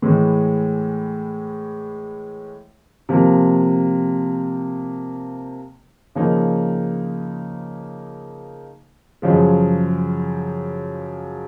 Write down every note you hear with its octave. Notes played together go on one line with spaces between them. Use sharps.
A2 E3 G#3
C3 F3 A#3
C#3 F3 A#3 D#4
F#2 C#3 F3 G#3